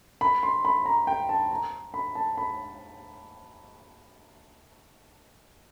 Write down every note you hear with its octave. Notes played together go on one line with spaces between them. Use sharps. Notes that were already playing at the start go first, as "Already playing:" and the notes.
B5
C6
B5
A#5
G5
A5
A#5
B5
A5
B5